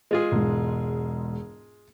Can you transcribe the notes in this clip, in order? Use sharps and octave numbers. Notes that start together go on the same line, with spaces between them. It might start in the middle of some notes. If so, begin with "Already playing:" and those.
G#3 F4 G#4
E1 G#2